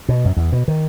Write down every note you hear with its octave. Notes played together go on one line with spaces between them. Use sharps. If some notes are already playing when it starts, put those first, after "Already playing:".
B2
F#2
E2
B2
D#3